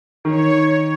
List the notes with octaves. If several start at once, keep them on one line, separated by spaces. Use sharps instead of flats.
D#3 C#5